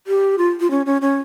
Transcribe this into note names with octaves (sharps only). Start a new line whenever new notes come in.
G4
F4
F4
C#4
C#4
C#4